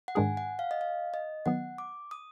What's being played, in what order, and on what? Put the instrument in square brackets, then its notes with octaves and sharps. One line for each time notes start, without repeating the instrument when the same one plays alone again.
[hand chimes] F#5
[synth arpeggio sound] G#2 D#3 G#3 D4 G#4 [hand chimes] G#5
[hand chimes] F#5
F5
D#5
F5
D#5
[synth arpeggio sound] D#3 F#3 B3 [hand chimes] F#5
[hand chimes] D6
D#6